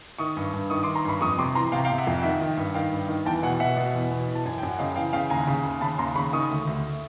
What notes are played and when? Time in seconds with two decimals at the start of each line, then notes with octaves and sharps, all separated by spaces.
0.19 D#3 C#6 D#6
0.37 G2
0.53 G2
0.70 D#3 C#6 D#6
0.83 C6 D6
0.87 D#3
0.95 A#5 C6
1.05 G2 B5 C#6
1.21 F2 C#6 D#6
1.38 C3 C6 D6
1.55 E3 A#5 C6
1.72 C3 F5 G5
1.85 F5 G5
1.90 C3
1.98 E5 F#5
2.07 F2
2.20 G5
2.23 D#3 E5 F#5
2.41 D#3
2.57 G2
2.74 D#3 F5 G5
2.92 G2
3.08 D#3
3.25 E2 G5 A5
3.43 B2 F#5 G#5
3.60 B2 E5 F#5
3.77 B2
3.94 E2
4.11 B2
4.28 E3
4.35 A5
4.45 F#2 G#5
4.58 F#2 G5
4.68 F#5
4.79 C#3 D#5 F5
4.96 E3 F5 G5
5.13 C#3 F5 G5
5.30 D#2 G#5 A#5
5.47 C#3
5.65 D#2
5.81 C#3 A5 B5
5.98 D#2 A#5 C6
6.15 C#3 B5 C#6
6.33 D#3 C#6 D#6
6.50 D2
6.67 D2